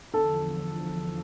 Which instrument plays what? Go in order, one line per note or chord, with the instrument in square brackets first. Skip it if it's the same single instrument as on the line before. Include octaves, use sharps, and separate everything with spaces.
[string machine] E2 D3 F3 [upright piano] A4